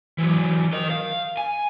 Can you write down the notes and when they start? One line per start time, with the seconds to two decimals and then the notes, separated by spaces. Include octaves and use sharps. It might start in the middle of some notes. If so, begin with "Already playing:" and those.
0.18 E3 F#3
0.73 A#4 D#5
0.90 F5
1.37 G#5